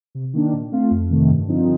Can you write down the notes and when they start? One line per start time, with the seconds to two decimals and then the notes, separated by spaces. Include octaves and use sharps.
0.15 C3
0.33 D#3 A#3 D4
0.53 A#2
0.72 A3 C4 F4
0.91 F2
1.09 C3 D#3 A3
1.29 G2
1.48 D3 F3 C4 D#4